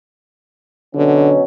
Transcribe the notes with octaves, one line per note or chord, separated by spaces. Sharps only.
B2 D3 F#3 C#4